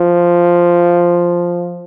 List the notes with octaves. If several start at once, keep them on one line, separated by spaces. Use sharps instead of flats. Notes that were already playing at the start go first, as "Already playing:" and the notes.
Already playing: F3